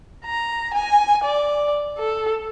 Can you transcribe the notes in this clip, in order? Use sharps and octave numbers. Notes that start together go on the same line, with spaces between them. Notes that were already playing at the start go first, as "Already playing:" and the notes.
A#5
G#5
D5
A4